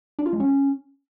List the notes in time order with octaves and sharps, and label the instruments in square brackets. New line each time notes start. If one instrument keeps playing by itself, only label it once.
[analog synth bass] D4
F4
G#3
C#4